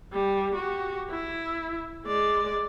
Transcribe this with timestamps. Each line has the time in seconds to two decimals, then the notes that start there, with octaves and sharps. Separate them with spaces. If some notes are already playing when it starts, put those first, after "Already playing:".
0.13 G3
0.55 F#4 G4
1.10 E4
2.06 G#3 D5